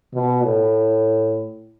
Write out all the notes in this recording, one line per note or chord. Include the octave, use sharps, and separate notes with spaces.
B2
A2